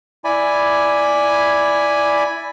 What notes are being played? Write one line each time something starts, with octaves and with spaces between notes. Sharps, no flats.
E4 D5 G#5 B5